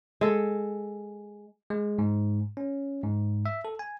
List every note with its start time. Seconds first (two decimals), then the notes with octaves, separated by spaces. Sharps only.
0.21 G#3 A4
1.70 G#3
1.99 G#2
2.57 C#4
3.04 G#2
3.46 E5
3.65 A4
3.79 G#5